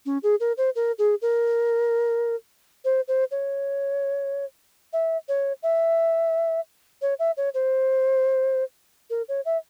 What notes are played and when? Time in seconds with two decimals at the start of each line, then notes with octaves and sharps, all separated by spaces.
0.06 C#4
0.23 G#4
0.40 A#4
0.57 C5
0.75 A#4
0.98 G#4
1.22 A#4
2.84 C5
3.08 C5
3.31 C#5
4.93 E5
5.28 C#5
5.63 E5
7.02 C#5
7.19 E5
7.37 C#5
7.54 C5
9.10 A#4
9.29 C#5
9.45 E5